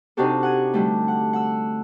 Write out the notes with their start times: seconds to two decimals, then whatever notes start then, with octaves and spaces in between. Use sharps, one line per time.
0.17 C3 D4 D#4 F#4 G4 A4
0.43 F#5 G#5
0.74 D3 G3 A3
1.08 F#5
1.33 F#5 E6